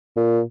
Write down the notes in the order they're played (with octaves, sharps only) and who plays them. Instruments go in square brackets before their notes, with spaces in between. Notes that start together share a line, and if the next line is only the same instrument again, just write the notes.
[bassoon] A#2